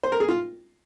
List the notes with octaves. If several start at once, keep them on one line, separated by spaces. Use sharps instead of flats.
C5
A#4
G#4
F4